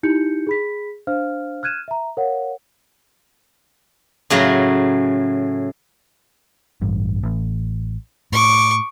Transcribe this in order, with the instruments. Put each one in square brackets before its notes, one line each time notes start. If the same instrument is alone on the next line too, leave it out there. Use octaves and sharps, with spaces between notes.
[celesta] D#4 E4 G4 G6 C#7
G#4 B5 B6
D4 C5 F5 F6
F6 F#6 G#6 D#7 E7
E5 A#5
A#4 C#5 F5 F#5
[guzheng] A2 C#3 F#3 A#5
[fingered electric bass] A1 G2
A1
[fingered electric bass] A2 [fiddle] C#6 D6